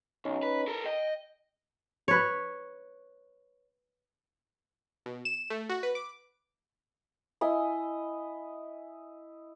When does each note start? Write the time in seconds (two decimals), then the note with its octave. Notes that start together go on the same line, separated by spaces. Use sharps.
0.25 B1 C#4 D#4
0.43 B4
0.67 A4 A#4
0.85 D#5 G5
2.08 B4 C#5
5.06 B2
5.25 E7
5.50 A3
5.69 F#4
5.83 B4
5.95 D6
7.41 E4 D#5 G#5